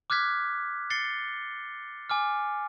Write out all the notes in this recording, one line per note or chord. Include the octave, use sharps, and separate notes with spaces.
D6 F6 F#6 G#6 B6
A6 C7 C#7 G7
G#5 D6 F6